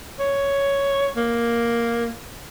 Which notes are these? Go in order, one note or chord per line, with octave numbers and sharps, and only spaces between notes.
C#5
A#3